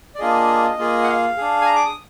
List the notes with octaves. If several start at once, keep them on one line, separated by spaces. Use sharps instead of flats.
D5
A#3 D4 F4 G#4 D#5
A#3 F4 G#4
F#5
F5
D4 G#4
G#5
A#5
D6
D#6